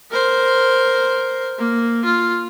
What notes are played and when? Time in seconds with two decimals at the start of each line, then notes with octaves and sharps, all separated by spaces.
0.11 A#4 C5
1.58 A#3
2.05 F4